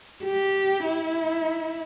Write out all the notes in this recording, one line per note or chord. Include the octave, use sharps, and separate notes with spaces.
G4
E4